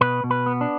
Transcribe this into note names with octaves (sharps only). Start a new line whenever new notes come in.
B2 B4
B2
B4
B3
D4